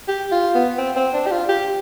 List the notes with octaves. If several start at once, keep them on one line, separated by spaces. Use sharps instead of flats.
G4
F4
B3
C4
C4
D4
G4
F4
G4